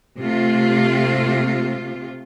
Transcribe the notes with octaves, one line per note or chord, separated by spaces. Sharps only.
C3 A3 F4